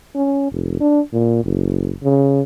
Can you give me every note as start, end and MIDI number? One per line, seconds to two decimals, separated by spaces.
0.15 0.48 61
0.52 0.76 29
0.80 1.00 62
1.13 1.40 46
1.44 1.93 30
2.03 2.41 49